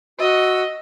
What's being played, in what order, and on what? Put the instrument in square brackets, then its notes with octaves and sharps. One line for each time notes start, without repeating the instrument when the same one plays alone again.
[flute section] F#4 E6 [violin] D#5